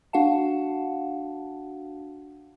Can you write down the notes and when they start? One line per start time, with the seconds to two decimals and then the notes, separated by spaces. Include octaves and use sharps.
0.13 D4 F#4 F5 F#5 A5